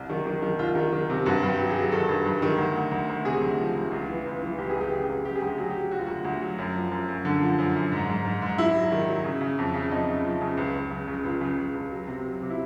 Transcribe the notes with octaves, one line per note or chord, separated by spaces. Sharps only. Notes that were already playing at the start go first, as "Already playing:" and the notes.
Already playing: C2
D#3
D#3
D#3
C2 F4
D#3
D#3
C3
G2 F#4
G2
G4
F#3
G#4
F#3
D#3 A4
G2
G2
D#3
D2
D2
D2
D2
C3 G#4
D2
F3
D2
C#2
E3
C#2
E3
C#2 G4
G#4
C#2
G4
C#3 G#4
G4
C#2 G#4
C#3 G4
G#4
D2
G4
F#3 G#4
G4
F#3
F#3 F#4
F4
D2 F#4
D2
F#3
F#2
F3
F#2
F#2
D3
F3
F#2
F#2
G#2
G#2
G#2
G#2
G#2 E4
F#3
D#3
F#3
C#3
C#3
F2
C#3
F2 D#4
C#3
F3
C#3
C#2
C#2
C#3
C#3
C#2 F4
C#3
C#3
C#2
F#3
C3
F#3
C3
E4